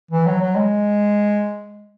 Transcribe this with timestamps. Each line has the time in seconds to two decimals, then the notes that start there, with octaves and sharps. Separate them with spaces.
0.11 E3
0.26 F#3
0.42 F#3
0.56 G#3